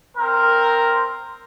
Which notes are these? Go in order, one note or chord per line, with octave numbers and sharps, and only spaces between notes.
C4 A#4